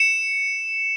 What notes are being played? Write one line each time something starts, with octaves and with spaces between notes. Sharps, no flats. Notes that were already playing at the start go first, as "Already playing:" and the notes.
Already playing: C#7 E7